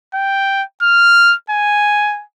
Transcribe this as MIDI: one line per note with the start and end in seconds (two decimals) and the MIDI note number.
0.14 0.63 79
0.82 1.35 89
1.50 2.23 80